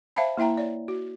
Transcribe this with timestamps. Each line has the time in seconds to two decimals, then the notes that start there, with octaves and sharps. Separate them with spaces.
0.16 C5 E5 F5 G5 A5 B5
0.37 A#3 E4 E5 G5 A#5
0.57 C#5 D5
0.88 F#4